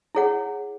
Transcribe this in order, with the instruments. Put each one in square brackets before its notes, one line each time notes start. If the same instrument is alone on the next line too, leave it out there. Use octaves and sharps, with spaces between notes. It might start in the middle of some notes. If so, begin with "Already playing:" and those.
[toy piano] E4 G#4 C#5 F#5